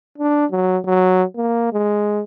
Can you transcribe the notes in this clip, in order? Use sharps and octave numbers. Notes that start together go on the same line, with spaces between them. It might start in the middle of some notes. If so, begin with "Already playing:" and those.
D4
F#3
F#3
A#3
G#3